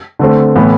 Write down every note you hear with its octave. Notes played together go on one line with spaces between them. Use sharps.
D3 A3 C4
A2 E3 B3